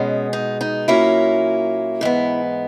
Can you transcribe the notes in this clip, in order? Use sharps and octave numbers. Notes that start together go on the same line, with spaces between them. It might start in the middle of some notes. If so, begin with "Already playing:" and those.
Already playing: B2 G#3 B3 C#4
D#4
D#4
A#2 F#3 A#3 C#4 E4
G#2 E3 B3